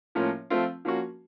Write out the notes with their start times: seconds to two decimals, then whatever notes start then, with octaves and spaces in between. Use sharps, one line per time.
0.15 A2 F3 A#3 C#4 F4
0.50 F3 A3 C4 F4
0.85 F3 A#3 C#4 F#4